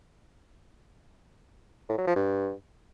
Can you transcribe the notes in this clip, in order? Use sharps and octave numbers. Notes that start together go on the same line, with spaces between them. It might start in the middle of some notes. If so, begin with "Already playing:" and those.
A2
F#3
F3
G2